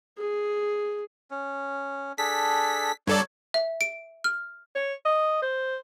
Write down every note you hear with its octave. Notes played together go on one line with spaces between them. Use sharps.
G#4
C#4
D4 G#4 A4 B6
G2 F#3 A4 C#5 D5 C#6
E5
D7
F6
C#5
D#5
C5